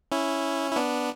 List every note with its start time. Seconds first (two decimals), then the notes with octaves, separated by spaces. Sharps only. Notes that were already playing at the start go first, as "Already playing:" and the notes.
0.12 C#4 E4
0.72 E4
0.76 B3 D4